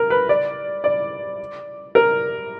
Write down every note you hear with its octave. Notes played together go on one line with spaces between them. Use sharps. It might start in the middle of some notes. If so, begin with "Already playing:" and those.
Already playing: A#4
B4
D5
D5
A#4